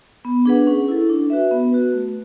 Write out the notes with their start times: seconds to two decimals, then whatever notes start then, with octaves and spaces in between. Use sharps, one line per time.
0.25 B3
0.46 D4 G#4 B4 F#5
0.67 C#4
0.88 E4 A4
1.09 D4
1.30 F#4 B4 E5
1.51 B3
1.72 F#4 B4
1.93 A3